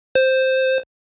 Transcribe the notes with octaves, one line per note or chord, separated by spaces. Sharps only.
C5